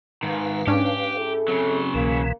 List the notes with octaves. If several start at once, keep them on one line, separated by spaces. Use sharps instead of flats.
G#2 D#3 B4 F5
G#2 C#4 D4 G4
E4 G#4 A4
C#3 F#3 C4
C2 B2 E3 A#3